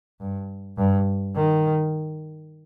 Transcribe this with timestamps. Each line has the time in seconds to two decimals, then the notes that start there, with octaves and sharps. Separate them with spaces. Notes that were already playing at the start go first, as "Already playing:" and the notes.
0.20 G2
0.78 G2
1.35 D#3